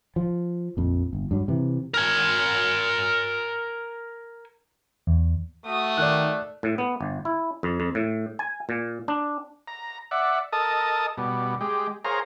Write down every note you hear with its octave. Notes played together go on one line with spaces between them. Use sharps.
F3
A#1 F2
G1
G2 F#3
C3 E3
A#4 G#5
E2
A3 F#4 D#6
D#3 D5 F#6
A2
B3
G1
E4
F2
F2
A2
G#5
A#2
D4
A#5
D5 E5 F#5
A4 A#4 D#5 A5 D#6
B2 G3
G#3 G4
G#4 A#4 C5 C#5 F5 A#5